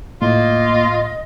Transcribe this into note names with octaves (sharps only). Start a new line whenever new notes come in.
A2 A#3 F4 D#5